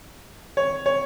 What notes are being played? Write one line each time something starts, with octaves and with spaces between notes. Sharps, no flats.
C#5
C#5